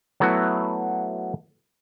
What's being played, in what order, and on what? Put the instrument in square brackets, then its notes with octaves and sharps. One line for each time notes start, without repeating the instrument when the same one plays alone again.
[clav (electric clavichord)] F#3 A3 B3 E4 F#4